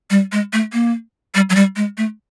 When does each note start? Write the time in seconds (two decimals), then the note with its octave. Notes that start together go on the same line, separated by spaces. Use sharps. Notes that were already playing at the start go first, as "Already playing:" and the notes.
0.10 G3
0.32 G#3
0.53 A3
0.73 A#3
1.35 G3
1.50 F#3
1.55 G3
1.76 G#3
1.97 A3